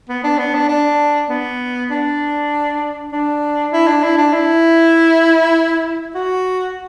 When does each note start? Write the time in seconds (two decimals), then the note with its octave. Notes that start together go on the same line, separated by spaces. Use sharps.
0.09 B3
0.24 D4
0.38 B3
0.54 D4
0.69 D4
1.30 B3
1.91 D4
3.12 D4
3.73 E4
3.88 D4
4.03 E4
4.17 D4
4.33 E4
6.15 F#4